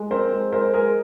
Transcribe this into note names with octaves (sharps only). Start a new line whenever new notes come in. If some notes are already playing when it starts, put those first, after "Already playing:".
Already playing: G#3
C4 A#4 C5
G#3
G#3 A#4 C5
G#3 G#4 A#4